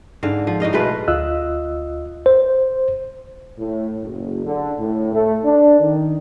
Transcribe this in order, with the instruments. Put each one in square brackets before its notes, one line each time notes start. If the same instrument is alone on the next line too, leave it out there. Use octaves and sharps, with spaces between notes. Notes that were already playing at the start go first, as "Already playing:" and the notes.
[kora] G#2 D3 F5
F3
A2 D#4 D#5 F5
B2 G#3 A3 B4
[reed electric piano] D2 F4 D#5 E6 F#6
[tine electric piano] C5
[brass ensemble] A2
F#1
D3
A2
A3
D4
D#3